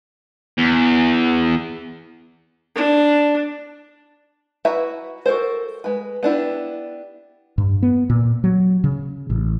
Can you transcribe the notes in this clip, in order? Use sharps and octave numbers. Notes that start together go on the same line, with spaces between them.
E2
D4
E4 F#4 B4 E5 A#5
F#4 A4 A#4 C5
G#3 B4
B3 D4 E4 G4
G2
B3
A#2
F#3
C#3
A1